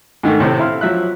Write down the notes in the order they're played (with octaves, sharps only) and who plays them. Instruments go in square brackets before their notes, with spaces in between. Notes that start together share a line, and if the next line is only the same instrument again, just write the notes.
[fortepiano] G#2 D#3 A3
A2 C3 A3 C4
E4 F5 C6
F3 F#3 E5 F#6